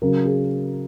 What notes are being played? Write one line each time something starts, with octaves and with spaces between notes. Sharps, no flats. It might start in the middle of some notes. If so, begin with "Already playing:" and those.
C#3 F#3 A#4
G#4